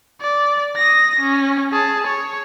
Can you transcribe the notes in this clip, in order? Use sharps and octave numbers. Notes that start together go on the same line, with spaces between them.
D5
D#6 A#6
C#4
G#4 A5
C#5